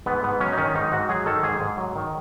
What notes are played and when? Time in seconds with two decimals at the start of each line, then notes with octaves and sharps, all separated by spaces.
0.06 G#2 B3
0.23 G#2 B3
0.40 F#3 C#4
0.53 D#4
0.57 D#3 C#4
0.74 G#2 D#4
0.92 G#2 F#4
1.09 F#3 G#4
1.26 D#3 A4
1.43 G#2 G#4
1.61 G#2
1.78 F#3
1.95 D#3